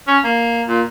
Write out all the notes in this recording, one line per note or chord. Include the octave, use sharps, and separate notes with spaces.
C#4
A#3
A#2